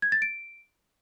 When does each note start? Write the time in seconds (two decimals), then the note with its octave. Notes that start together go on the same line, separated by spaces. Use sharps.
0.02 G#6
0.12 A6
0.22 D7